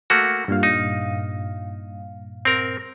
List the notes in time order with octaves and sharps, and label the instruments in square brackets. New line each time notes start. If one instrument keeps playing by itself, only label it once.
[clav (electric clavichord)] A3 A#3 F#4
[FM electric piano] G2 A#2 F5
[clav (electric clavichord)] D#4
C4 A#4